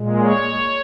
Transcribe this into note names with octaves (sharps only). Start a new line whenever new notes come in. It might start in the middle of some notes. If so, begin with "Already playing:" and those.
Already playing: A#2 G#3
C#5